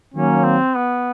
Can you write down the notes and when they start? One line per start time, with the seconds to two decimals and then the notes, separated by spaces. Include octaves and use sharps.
0.14 D#3 F#3 A#3 C#4
0.44 C4
0.75 B3